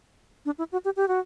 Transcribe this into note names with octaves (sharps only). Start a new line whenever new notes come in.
D4
E4
F#4
G4
G4
F#4